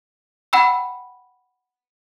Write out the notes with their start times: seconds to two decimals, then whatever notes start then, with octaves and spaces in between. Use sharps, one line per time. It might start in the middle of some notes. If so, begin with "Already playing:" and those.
0.53 F#5 G5 B5 E6